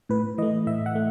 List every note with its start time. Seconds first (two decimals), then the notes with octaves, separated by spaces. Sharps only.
0.09 A2 B4
0.38 E3 D#5
0.42 A3
0.67 A2 E5
0.86 F#5
0.95 A3